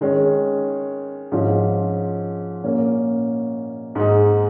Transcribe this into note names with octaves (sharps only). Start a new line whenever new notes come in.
D#3 G#3 C#4
G#2 F3 C#4 F4
A#2 A#3 C#4
G#2 G#3 D#4